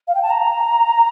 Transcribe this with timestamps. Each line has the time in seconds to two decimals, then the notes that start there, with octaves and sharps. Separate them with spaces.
0.08 F5
0.15 G5
0.23 A5
0.30 A#5